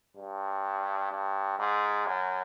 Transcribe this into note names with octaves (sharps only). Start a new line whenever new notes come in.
G2
G2
G#2
F#2